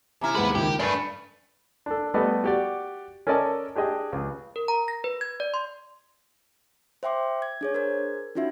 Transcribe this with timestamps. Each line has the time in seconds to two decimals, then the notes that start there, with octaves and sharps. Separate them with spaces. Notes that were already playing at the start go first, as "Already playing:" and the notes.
0.21 C3 E4 G#5 A#5 F6
0.35 D#2 G#3 B3 B4
0.55 C#2 D#3 G4
0.80 A3 D4 B4 G#5 B5 A6
1.86 D4 A4
2.14 G3 A3 B3 D5 D#5
2.44 F#4 G4 D5
3.27 C#4 A4 A#4 D5 D#5 A5
3.75 D4 G4 G#4 D#5 G5
4.12 C#2
4.56 A#4
4.68 A#5
4.88 A#6
5.04 B4
5.21 G#6
5.40 D5
5.54 C6
7.03 C5 E5 G5 C6 D6
7.42 G#6
7.61 D4 G#4 C#5
7.74 G#4 A#4 C5 G#6
8.35 C#4 D#4 F4 F#4 E5